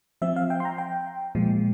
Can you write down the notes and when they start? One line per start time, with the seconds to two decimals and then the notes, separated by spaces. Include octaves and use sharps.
0.22 F3 C4 E5
0.36 F5
0.50 G5
0.60 C6
0.65 A#5
0.78 G5
1.35 A#2 F3 G#3